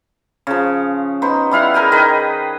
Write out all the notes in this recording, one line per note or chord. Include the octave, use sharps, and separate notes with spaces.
C#3 F3
B3 D#4 C5
G3 E4 F5 F#5
G#4 A#4 G5 G#5
D#3 B4 D#5